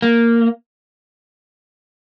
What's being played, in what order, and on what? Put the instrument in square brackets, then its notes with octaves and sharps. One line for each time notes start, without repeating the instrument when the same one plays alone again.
[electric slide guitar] A#3